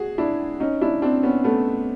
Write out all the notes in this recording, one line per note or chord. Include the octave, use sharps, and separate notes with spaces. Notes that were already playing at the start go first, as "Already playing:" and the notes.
Already playing: F#4 G#4
D4 E4
C#4 D#4
D4 E4
C4 D4
B3 C#4
A3 B3